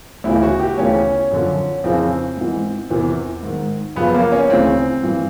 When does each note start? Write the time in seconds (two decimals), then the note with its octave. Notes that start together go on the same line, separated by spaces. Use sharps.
0.24 D2 C#3 E3 E4
0.43 F#4
0.60 G4
0.77 D2 C#3 E3 C#4
1.31 F#2 D3 F3
1.84 F2 C#3 E3 C4
2.37 G#2 E3
2.90 E2 C3 E3
3.43 G#2 D#3
3.96 F#2 C#3 F3 B3
4.14 A#3
4.32 C#4
4.49 D2 C#3 E3 C4
5.02 G2 E3